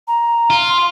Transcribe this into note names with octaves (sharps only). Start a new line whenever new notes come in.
A#5
F4
C6